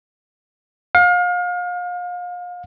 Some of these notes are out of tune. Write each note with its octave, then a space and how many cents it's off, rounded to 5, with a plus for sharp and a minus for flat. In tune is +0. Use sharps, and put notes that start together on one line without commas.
F5 +35